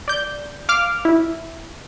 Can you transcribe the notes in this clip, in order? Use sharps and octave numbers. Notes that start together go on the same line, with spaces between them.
D5 G6
F5 D6 F6
E4